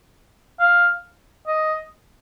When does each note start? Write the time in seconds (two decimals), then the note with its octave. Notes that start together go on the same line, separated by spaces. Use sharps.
0.60 F5
1.47 D#5